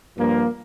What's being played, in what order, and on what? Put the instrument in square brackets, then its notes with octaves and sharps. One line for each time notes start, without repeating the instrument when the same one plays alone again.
[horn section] G2 F3 A#3